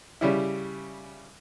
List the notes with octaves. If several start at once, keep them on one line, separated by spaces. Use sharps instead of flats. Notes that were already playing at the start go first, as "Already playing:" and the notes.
C#3 G3 E4